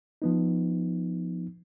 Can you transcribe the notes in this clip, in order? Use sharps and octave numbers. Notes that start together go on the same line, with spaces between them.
F3 B3 D#4